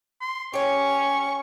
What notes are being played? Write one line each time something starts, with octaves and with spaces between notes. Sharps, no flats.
C6
C#4 G4 C#5 C#6